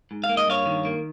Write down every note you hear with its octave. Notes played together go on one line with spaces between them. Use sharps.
G#2
F5
A#3
D#5
G2 C#5 F5
D#3
A#3